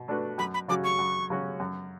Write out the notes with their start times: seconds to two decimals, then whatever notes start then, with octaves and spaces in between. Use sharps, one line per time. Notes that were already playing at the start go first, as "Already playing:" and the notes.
Already playing: B2
0.08 A3 D4 F#4 B4
0.38 F#2 B5
0.54 B5
0.68 C#3 F#3 C#4 F#4 D6
0.84 C#6
0.99 F#2
1.30 C#3 F#3 C#4 F#4
1.60 F#2